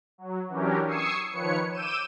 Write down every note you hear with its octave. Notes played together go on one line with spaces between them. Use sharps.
F#3
E3 F#3 C#4 D4 G4 A#4
C#6 D#6 E6 G#6 C7 C#7
D#3 F3 B4 C#5 C#7
D6 E6 G6 D#7 E7